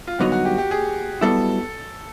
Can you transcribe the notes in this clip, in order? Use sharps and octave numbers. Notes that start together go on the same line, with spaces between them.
F4
G2 D3 F#3 B3 D#4 F#4
F#4
G4
G4
G#4
B1 B2 G3 B3 E4 A4